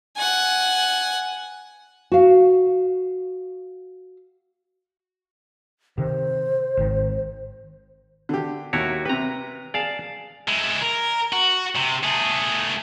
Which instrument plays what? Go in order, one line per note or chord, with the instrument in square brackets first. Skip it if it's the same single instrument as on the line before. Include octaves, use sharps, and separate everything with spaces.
[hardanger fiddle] F#5 G#5
[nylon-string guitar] F#4 F5
[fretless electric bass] C3 D#3 [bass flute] C5
[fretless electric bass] G#1 C3 D#3
[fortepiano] D3 G4
[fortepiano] D#2 [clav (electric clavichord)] E4 F#4 C#5
[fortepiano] C3 G4 [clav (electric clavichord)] B4 A#5
[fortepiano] G#4 [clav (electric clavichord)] D5 F5 A5
[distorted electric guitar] G#3 E4
A#4
F#4
C3
A3 G#4